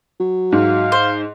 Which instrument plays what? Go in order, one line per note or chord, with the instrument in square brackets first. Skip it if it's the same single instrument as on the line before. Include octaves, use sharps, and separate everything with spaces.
[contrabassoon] F#3
[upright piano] G#2 [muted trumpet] F5
[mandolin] C5